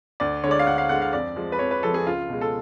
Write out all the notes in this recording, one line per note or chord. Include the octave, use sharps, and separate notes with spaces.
D2 D5
D3 G#3 C#5 D5
F5
D2 F#5
F5
D3 G#3 F#5
F5
F2 D5
F3 G#3
B4
F2 C#5
B4
F3 G#3 A4
G#4
C#2 F4
B2 G#3
A4